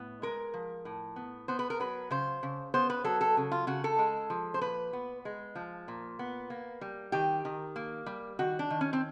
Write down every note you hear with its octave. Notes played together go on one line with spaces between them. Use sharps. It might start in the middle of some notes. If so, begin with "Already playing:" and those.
Already playing: A2 B3
G#3 A#4
F3
A2
B3
B3 C5
B4
A#4
F#3 B4
C#3 C5
C#3
B3 C5
B4
F#3 A4
A4
C#3
F4
C#3 F#4
A4
G#3
F3
C5
A#2 B4
B3
G#3
F3
A#2
B3
A#3
G3
D#3 G4
D#3
A#3
G3
D#3 F#4
D4
D#3
C#4
C4